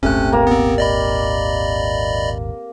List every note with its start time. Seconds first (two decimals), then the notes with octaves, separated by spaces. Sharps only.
0.03 D#1 G#1 C3 A3 C#4 F#6
0.32 A#3 A#5
0.47 B3 C4
0.78 D5 D#5 B5